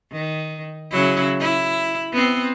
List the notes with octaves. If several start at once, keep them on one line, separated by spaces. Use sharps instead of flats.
D#3
C#3 F#3 E4
E4
B3 C4